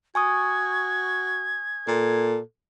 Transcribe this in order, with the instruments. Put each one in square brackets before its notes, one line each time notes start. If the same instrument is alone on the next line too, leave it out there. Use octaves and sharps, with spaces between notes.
[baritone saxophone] F#4 [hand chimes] G#5 C#6 D#6 [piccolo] G#6
[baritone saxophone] A#2 [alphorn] A4